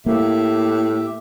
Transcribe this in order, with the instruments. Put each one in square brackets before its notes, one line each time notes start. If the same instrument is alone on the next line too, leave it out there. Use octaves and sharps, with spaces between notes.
[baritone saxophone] A2 [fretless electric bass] A#3 [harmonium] G4 E5